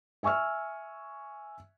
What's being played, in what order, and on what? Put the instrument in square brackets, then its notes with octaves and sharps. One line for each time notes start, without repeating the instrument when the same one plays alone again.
[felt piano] E5 G#5 C#6 E6 F6